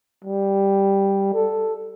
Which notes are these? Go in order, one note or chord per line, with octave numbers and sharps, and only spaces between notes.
G3
A4